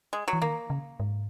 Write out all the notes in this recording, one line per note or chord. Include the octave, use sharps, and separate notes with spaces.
G#3
F#3
E3
D#3 A#3
C#3
G#2